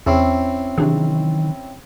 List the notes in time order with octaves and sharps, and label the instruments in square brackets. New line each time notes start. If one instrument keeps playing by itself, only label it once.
[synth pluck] E2 [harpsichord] C4 C#4 E4
[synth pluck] C3 D4 G#4 [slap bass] D#3 E3 F#3